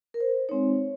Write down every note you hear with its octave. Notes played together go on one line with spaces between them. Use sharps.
A#4
C5
G#3 C4 D#4 C#5